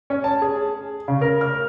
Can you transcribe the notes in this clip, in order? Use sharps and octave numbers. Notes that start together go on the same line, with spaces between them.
C#4
A5
G#4
C#3
A#4
F6